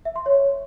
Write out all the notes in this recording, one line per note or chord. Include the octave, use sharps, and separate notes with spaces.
E5
C6
C#5